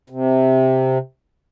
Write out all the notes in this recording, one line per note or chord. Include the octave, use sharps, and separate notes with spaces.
C3